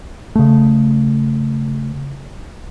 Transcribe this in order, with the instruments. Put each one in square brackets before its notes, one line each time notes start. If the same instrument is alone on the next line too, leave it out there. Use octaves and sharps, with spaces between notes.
[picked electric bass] C#3 A3